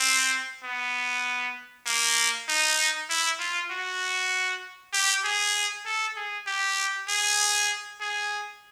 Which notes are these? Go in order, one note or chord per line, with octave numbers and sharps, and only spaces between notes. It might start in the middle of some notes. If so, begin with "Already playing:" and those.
Already playing: C4
B3
A#3
D#4
E4
F4
F#4
G4
G#4
A4
G#4
G4
G#4
G#4